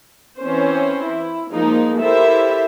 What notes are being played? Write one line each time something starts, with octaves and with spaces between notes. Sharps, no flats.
E3 C4 C#4 C5
E4
F3 G#3 A#3 D#4
E4 G4 A4 A#4 C5 E5